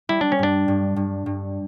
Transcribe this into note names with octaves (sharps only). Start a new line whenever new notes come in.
G3 E4
D4
C#4
G2 D4
G2
G2
G2